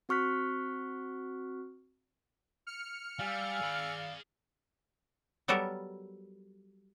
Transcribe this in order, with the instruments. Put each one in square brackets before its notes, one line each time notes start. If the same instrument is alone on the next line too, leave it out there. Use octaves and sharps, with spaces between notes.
[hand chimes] C4 F#4 C#6 F6 F#6 B6
[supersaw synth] F6 C#7
[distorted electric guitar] G3 [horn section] D5 F5 [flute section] G#5 E6
[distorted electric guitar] G#4 B5
[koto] F#3 G3 B3 F#4 A4 A#4